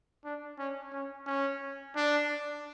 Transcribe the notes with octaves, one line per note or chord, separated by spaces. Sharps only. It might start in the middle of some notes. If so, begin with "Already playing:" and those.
D4
C#4
C#4
C#4
D4